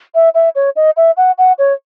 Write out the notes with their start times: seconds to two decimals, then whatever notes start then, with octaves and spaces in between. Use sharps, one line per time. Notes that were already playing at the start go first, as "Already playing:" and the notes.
0.15 E5
0.35 E5
0.55 C#5
0.76 D#5
0.97 E5
1.17 F#5
1.38 F#5
1.58 C#5